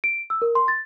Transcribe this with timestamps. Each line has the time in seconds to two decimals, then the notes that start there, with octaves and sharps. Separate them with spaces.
0.04 D7
0.30 E6
0.42 A#4
0.55 C6
0.68 A6